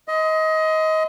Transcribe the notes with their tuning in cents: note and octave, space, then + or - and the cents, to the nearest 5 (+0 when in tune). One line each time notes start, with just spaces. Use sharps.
D#5 +25 C6 -30